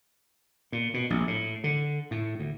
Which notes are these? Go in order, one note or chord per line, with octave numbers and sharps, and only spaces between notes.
A#2
B2
A#1
A2
D3
A2
D2